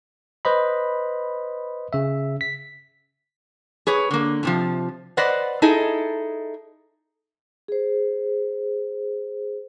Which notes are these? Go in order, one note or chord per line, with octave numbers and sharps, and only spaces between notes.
B4 C5 D#5 B5
C#3 E5
B6
G#4 B4 C#5
D3 A#3
A2 C3 F3
B4 C5 D5 D#5 F#5
D#4 E4 G#4 A4 D#5
G#4 C5